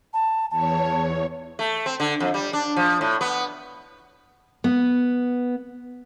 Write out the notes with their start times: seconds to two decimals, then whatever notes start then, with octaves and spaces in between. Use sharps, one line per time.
0.13 A5
0.50 E2 C#5 A5
1.59 A3
1.86 C4
2.00 D3
2.20 F2
2.34 G3
2.53 D4
2.77 F3
3.01 A2
3.21 B3
4.64 B3